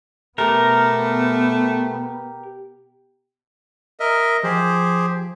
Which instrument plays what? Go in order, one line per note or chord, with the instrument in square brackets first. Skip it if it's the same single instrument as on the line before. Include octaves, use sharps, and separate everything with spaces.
[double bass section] B2 B3 [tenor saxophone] A3 [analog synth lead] G4 [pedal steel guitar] A#4
[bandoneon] A#4 D#5 E5 [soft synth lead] F6
[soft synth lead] F3 [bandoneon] G4 G#4 C5